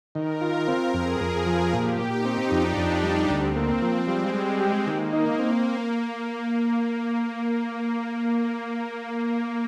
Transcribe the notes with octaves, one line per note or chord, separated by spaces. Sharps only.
D#3 A#4
F4
C4
F2 G#4
F2
G#4
F3
A#2 G4
A#2
D#4
C4
F2 D4
F2
G3
D2 C4
A#3
F3
G3 G#3
G3
G4
D#3 A#3
D#4
C4